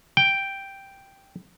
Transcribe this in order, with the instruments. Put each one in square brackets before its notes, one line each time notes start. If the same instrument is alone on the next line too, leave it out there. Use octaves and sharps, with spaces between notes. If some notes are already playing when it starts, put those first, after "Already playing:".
[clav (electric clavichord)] G5